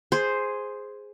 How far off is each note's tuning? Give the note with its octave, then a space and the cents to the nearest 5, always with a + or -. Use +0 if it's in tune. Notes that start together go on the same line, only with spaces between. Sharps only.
G#4 +0 C5 +0